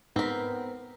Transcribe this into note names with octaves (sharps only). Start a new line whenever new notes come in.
G#2 B3 C4 A#4 B6